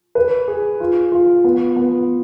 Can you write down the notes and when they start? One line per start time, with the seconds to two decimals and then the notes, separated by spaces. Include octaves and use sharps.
0.15 B4
0.48 G#4
0.80 F4
1.12 F4
1.44 B3
1.76 B3